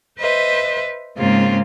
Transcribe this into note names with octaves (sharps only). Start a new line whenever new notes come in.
B4 C5 D#5 E5
G#2 C#3 G#3 A#3 C4 F4